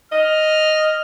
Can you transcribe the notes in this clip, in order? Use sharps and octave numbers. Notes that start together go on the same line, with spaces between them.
D#5 F6